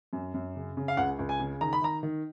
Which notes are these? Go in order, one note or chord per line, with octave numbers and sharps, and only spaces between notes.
F#2
F#2
C#3
C#3
F5
C#2 F#5
C#2
G#5
C#3
D#3 A#5
B5
D#3 A#5
D#3